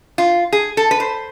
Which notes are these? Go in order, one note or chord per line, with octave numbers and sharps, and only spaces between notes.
F4
G#4
A4
B4
C5